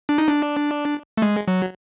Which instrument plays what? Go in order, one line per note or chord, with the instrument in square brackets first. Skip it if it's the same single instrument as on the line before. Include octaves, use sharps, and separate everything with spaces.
[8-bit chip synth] D4
D#4
D4
A3
G#3
F#3